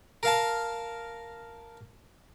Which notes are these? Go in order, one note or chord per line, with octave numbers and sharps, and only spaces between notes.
A#4 F5 A5